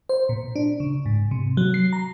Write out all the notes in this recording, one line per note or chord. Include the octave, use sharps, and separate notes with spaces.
C5
A#2
D4
C#3
G#2
C3
F#3
C7
A#5